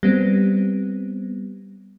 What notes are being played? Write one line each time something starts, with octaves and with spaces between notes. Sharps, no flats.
G3 B3 C4